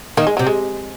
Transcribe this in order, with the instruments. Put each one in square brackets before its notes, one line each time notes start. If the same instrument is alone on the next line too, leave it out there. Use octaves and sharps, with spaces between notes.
[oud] D#3 [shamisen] A#3
[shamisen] G#3
[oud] C3 [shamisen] F#3
[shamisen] G#3